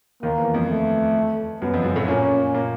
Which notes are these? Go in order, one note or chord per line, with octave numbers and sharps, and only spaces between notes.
D#2 D#3 A#3
E2 E3
F2 F3
A3
F#2 F#3 B3
F2 F3
F#2 F#3
A2 A3
A#2 A#3 C#4
A#2 A#3